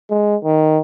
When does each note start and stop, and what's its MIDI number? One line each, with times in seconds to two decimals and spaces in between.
0.10 0.36 56
0.44 0.80 51